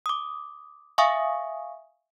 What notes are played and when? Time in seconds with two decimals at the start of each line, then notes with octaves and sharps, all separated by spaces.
0.06 D6 D#6
0.98 E5 F5 G#5 C#6 D#6